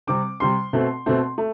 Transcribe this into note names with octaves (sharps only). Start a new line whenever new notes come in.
C3 G3 C4 D6
C3 G3 C4 C6
B2 A3 C4
B2 A3 C4
A3